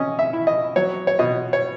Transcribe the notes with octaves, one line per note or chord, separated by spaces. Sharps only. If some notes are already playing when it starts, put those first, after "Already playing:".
Already playing: C#4 D#5
E5
E4
D#5
F#3 C#5
C#5
B2 D#5
C#5